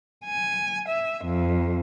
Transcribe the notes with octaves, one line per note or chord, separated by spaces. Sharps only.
G#5
E5
F2